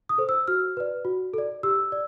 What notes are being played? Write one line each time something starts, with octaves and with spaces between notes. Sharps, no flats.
D#6
A4 C5
E6
F#4 F6
B4 D5
F#4
A4 D5
G4 E6
D5